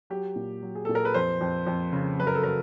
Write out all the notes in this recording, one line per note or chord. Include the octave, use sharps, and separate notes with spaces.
F#3 G4
A#2
F#3
G#4
A#2 A4
A#4
B4
F2 C5
F2
F2
C#3
F#2 B4
A#4
A4
F#3 A#4